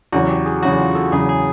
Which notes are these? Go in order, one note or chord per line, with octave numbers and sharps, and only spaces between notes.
E2 C#3 F#3 F#4
G4
G#4
E2 C#3 F#3 F#4
F4
A4
E2 C#3 F#3 G#4
G#4